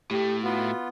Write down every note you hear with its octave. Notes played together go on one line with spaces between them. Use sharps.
A2 A3 G4
B3 F4 F#4